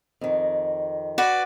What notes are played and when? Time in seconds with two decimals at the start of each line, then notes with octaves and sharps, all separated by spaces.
0.21 F2 D#3
1.18 F#4 B4 D5